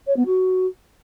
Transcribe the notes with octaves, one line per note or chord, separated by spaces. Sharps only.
C#5
B3
F#4